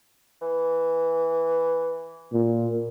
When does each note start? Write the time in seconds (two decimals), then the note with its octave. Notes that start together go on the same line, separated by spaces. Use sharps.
0.41 E3
2.33 A#2